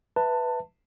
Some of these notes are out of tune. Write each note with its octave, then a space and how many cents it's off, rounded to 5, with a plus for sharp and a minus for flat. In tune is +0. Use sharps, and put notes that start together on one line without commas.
B4 +0 E5 +0 A5 +20